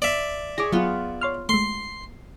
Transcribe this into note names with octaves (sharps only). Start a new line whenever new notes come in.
D5 E5
G#4 C#5 D6 A#6
F#3 B3 F4
C#5 C6 F6
G#3 A3 C6